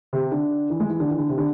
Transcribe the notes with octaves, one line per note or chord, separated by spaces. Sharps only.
C3
D3
E3
G#3
E3
D3
E3
D3
C3
D3